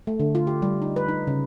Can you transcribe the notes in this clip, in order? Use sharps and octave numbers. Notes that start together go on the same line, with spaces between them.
A3
D3
F4
G4
G3
D#4
B4
D#4
C#3